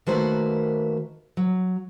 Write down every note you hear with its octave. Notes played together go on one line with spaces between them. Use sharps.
D#3 A3 A#3 F#4 B4 C5
F#3